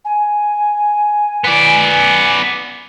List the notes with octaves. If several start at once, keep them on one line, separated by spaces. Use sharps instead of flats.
G#5
B3 D5